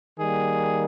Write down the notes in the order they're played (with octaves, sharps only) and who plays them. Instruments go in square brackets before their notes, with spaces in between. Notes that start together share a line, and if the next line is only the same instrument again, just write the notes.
[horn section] D#3 G3 A#3 G#4